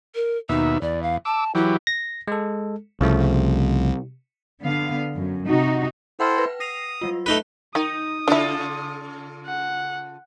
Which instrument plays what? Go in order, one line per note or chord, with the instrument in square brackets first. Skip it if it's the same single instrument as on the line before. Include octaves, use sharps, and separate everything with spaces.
[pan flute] A#4
[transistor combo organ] D#2 B2 E5 [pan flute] D#4
[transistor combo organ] E2 [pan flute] D5
[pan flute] F5
[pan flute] A5 [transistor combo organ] D6 E6
[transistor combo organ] E3 F#3 G4 [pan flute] E4
[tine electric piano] A#6
G#3 A4
[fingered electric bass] C2 [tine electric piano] C#3 F3 A3
[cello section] D3 B3 F5
F#2
C3 D#4 F#4
[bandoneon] E4 A4 C5 [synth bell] F#5 G5 F6
[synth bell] B4
[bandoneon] D#6 [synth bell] A#6 C7 F7
[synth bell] F#3 G3 F4
[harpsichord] A3 D#4 B4 [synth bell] F#6
[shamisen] D#3 [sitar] D#4 [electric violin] D#6
[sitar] C#3 F4 A4 [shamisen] D4 E4
[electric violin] F#5